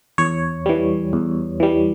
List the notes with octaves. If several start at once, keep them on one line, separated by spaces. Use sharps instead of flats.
E2 C#5
E3 G3
E2
E3 G3